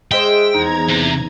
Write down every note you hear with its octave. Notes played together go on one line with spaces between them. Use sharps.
G#3 C5 E5 G5
E2 D#4 A#5 G#6
C3